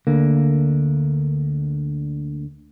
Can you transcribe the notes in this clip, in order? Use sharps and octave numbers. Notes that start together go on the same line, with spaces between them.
D2 D3 A#3